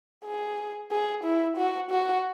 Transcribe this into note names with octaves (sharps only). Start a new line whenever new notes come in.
G#4
G#4
E4
F#4
F#4